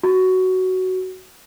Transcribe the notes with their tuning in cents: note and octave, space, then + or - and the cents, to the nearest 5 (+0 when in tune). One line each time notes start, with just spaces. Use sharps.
F#4 +10